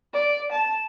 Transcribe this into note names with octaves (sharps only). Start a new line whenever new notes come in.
D5
A5